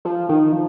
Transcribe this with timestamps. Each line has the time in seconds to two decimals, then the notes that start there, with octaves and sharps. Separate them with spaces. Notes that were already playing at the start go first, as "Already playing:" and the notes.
0.05 F3
0.29 D#3
0.52 F3